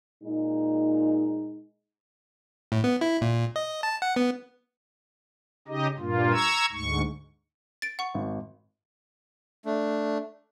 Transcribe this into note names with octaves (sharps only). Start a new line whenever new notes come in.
A#2 G#3 D#4
A2
B3
E4
A#2
D#5
A5
F#5
B3
C#3 D#4 G4 D#5
G2 A#2 A#3 F4
A#5 C#6 E6 G#6
D2 G#2 C#6
A6 D7
F#5 C#6
G#1
A3 D4